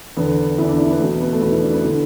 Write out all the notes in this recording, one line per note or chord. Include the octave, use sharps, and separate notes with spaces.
E2 D3 B3
E2 D3 E4
D4
E4
B3
E2 B2 A3
B3
A3
E2 B2 B3
E4
D4
B3
D3 E4